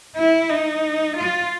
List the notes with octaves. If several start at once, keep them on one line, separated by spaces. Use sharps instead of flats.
E4
D#4
F4